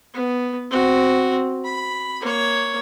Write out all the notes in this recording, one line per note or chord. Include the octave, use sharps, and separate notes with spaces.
B3
C4 F#4
B5
A#3 C#5